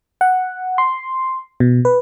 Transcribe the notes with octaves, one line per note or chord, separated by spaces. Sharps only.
F#5
C6
B2
B4